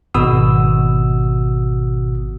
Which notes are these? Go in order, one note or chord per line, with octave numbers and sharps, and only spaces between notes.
G#1 B2 F#4 D#6 E6